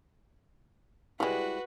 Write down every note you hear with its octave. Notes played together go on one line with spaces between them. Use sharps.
G3 G#3 E4 F#4 G4 B4 D5